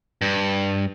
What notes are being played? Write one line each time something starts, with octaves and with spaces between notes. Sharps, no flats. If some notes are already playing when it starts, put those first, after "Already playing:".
G2